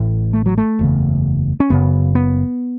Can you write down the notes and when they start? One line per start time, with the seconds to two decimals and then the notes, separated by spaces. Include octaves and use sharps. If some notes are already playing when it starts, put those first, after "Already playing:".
Already playing: A1 A2
0.33 A3
0.46 F#3
0.58 A3
0.79 F#1 E2 C#3
1.60 C#4
1.70 F#1 F#2 C#3 B3
2.15 B3